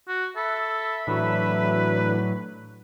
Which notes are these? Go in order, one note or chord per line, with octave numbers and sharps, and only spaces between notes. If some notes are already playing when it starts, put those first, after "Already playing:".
F#4
A4 E5 B5
A2 E3 F#3 A3 D4 B4